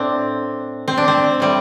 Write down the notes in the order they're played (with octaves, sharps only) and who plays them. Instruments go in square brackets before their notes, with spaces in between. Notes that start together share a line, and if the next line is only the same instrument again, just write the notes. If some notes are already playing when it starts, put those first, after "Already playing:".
Already playing: [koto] A2 C4 D4
C4
D4
C4
A2 G3 C4